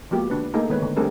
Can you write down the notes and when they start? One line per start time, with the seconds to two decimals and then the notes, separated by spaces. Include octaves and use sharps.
0.11 F3 G#3 A#3 B3 F#4 G4
0.30 D3 D4 B4
0.54 A3 A#3 D#4 G#4 A4
0.69 D#3 G#3 B3 B4 C#5
0.82 D3
0.96 G3 A3 C4 D4 G#4 A#4